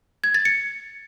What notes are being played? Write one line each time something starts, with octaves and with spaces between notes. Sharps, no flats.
G#6
A6
C#7